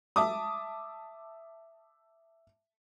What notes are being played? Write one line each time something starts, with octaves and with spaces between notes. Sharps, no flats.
E5 A5 D6 D#6